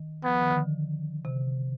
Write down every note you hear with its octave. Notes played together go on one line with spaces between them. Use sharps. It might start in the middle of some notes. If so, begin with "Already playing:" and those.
Already playing: D#3
F3 B3
D#3
D3
C3